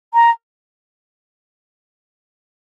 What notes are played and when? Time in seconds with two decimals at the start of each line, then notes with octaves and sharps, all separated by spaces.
0.14 A#5